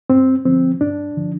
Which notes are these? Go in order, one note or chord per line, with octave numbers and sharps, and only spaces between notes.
G2 C4
D3 F3 C4
G2 D4
D3 F3